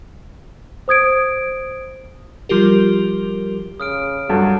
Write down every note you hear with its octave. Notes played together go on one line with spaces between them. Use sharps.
C5 D#6 G#6 D7
F3 G3 F4 G4 A#4
C#3 D#6 F6 D7
G2 F#3 F#4 A4